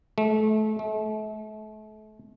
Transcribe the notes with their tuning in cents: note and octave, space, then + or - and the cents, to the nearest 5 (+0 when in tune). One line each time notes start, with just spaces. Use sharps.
A3 -30
A3 -40